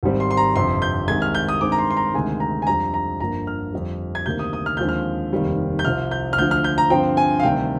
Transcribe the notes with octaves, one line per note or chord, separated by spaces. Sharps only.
G#1 G#2 G3 C4
C6
C6
A#5
G1 F2 C3 C6
G6
C2 C3 D#3 G#3 G#6
F6
G6
D#6
G2 D#3 G#3 C4 D6
A#5
C6
C6
A#5
D2 C3 D#3 G#3 G#5
A#5
G#5
F2 D3 G3 A#5
A#5
G1 G2 D3 F3 A#3 A#5
F6
F2 D3 G3
G#6
D2 C3 D#3 G3 A#3 G6
D#6
D#6
F6
D#2 D3 F3 G#3 C4 G6
F6
F1 D#2 D#3 G3 C4
G6
C2 C3 F3 C4 F6
G6
F6
D2 D3 F3 G6
F6
G6
A#5
G2 D3 F3 C4 G5
G#5
F5
D2 C3 D#3 G3 G5